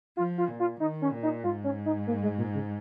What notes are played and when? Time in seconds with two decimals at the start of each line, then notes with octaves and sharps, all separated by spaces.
0.17 F3 F4
0.38 F4
0.49 A#2
0.60 F4
0.80 D#3 D#4
1.02 C#4
1.12 A#2
1.23 D#4
1.44 G#2 F4
1.64 C#4
1.86 D#4
2.07 A#3
2.23 G#3
2.38 A#2
2.54 C#3